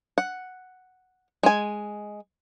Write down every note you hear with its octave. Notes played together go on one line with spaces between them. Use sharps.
F#5
G#3 G#5